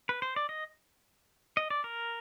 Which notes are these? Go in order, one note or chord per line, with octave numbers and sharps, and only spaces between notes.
B4
C5
D5
D#5
D#5
D5
A#4